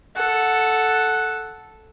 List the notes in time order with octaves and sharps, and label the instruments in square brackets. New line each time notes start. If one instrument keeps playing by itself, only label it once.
[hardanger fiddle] A4 [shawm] F#5